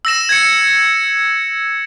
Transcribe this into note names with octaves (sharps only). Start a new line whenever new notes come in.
E6 A#6 E7
G#6 C#7